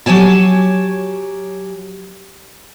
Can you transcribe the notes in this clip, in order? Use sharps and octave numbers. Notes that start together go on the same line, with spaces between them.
F#3 G4 C#5 G#5 A5